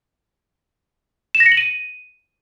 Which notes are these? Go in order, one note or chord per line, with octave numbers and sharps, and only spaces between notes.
E7
A#6
C#7
F#7
D#7